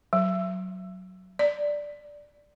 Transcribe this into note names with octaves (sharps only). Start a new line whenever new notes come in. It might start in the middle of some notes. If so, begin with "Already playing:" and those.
F#3
D5